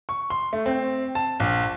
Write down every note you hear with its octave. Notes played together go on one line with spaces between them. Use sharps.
C#6
C6
A3
C4
A5
A#1